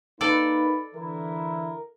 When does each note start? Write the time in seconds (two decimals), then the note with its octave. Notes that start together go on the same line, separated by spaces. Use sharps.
0.21 A#3 D#4 A4 B4 D5
0.95 D3 E3 E4 A#4